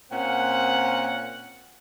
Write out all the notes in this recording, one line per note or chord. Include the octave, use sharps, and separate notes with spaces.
A#2 C4 C#4 F#5